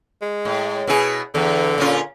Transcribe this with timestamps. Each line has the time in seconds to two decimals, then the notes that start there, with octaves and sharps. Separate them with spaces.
0.22 G#3
0.45 A2
0.87 B2 E4 G#4
1.35 E2 D3
1.78 A#2 C#4 F4